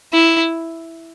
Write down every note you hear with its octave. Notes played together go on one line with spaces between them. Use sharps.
E4